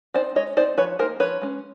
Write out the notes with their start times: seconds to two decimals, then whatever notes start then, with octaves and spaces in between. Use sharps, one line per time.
0.14 C4 D#4 C5 D5
0.35 G#3 C#5 D#5
0.57 C4 D#4 C5 D5
0.77 F3 B4 C#5
0.99 D#4 A#4 C5
1.03 A#3
1.20 F3 B4 C#5
1.41 G#3 C#4